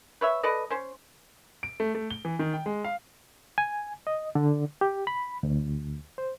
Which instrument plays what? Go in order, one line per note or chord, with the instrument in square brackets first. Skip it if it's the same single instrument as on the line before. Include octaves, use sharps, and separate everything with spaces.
[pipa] B4 C#5 E5
A4 B4 D5 D#5
C#4 C5
[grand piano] D7
A3
A3
G7
E3
D#3
G5
G#3
F5
[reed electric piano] G#5
D#5
D3
G4
B5
D2
C5